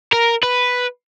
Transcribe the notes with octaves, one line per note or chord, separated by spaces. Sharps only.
A#4
B4